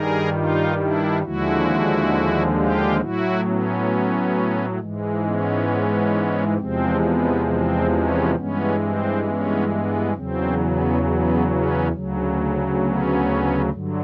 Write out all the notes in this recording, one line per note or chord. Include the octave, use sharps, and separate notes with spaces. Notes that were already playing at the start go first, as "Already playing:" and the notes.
Already playing: G2 D#3 G3 G#4 A#4
D#4 F4
D4 E4
D#2 D3 F3 G#3 E4 F#4
F4 G4
A2 F#3 E4 F#4
B3 C#4
G#2 E3 G#3
B3 C#4
E2 C3 F3 G#3 C4
B3
C4
B3 C#4
G2 E3 G#3 B3 C#4
C4
B3 C#4
B3
E2 C#3 F#3 C4
B3
B3
B3 C#4
D2 C#3 F#3
B3 C#4
G2 D3 F#3